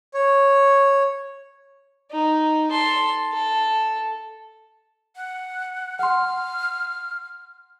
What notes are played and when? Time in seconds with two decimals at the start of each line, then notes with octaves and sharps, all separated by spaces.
0.14 C#5
2.11 D#4
2.71 A4 C6
3.32 A4
5.16 F#5
5.99 F#5 C6 F6